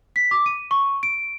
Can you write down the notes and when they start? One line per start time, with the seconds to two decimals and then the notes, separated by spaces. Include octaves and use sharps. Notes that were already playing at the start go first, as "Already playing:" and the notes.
0.16 B6
0.31 D6
0.46 D#7
0.71 C#6
1.03 D7